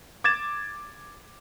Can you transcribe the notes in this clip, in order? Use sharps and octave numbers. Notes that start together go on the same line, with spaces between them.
D6 G#6 A6 E7